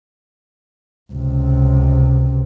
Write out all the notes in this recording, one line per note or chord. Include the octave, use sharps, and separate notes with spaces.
C#2 C3